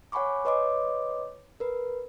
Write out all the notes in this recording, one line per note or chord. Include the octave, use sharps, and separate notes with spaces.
C#5 F#5 G#5 B5 C#6 D6
B4 C#5 D#5 C6 D6
A#4 B4